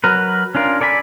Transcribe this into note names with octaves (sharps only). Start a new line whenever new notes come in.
F#3 A#4 B4
C#4 D4 F4 A#4
A4 D5 G#5 A#5 B5